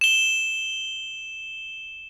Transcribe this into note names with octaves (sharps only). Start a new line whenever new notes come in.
E7 G7